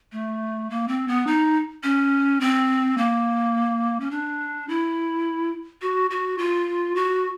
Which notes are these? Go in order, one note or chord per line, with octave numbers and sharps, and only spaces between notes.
A3
A#3
C4
B3
D#4
C#4
C4
A#3
C#4
D4
E4
F#4
F#4
F4
F#4